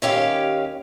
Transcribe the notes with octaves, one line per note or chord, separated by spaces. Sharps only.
D#2 C#4 G4 F5